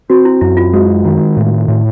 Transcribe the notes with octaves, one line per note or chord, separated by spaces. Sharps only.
C4 F#4
E4
F#2 E4
F4
G#3 F#4
D#3
A2
A2